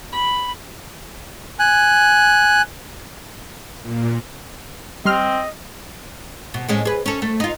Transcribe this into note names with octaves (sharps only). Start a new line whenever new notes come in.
B5
G#5 F#6
A#2
G3 C4 D#5 C6 F6
B2
A2 G#3 C#4
G#4 B4
C#4 A4
A3
D#4 F4